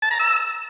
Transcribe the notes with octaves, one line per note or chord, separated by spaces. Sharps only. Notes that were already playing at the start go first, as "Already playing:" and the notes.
A5
A#5
E6